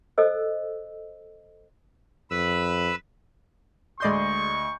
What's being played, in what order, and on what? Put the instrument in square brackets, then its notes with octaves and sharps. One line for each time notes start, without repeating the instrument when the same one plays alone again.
[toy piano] A4 C5 D#5 E6
[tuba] F2 [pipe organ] B4 B5 E6
[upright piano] D2 D#5 G6 [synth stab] G#3 D5 C6 [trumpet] C#6